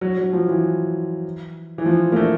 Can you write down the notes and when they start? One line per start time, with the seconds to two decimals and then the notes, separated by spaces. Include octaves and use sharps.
0.01 F#3
0.17 F#3
0.33 F3
0.48 E3
1.78 E3
1.86 F3
2.12 A#3
2.16 A3